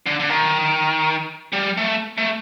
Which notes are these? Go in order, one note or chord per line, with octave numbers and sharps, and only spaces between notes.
D3
D3
D#3
G3
A3
A3